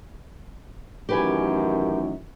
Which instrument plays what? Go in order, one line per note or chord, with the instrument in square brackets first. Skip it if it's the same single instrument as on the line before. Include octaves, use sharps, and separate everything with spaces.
[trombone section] A1 F#2 D#3 [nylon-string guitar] G4 B4 G#5